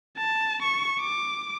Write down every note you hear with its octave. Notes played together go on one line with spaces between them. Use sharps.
A5
C#6
D6